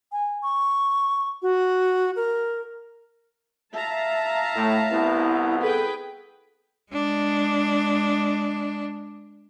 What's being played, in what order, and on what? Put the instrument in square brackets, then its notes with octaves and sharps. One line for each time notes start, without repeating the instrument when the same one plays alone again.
[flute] G#5
C#6
F#4
A#4
[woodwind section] E5 [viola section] F5 A5 A#5
[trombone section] A2 [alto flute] A3
[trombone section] C2 B3 [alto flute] E4
[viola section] G#4 B4 G5 [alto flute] A4
[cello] G#3 D4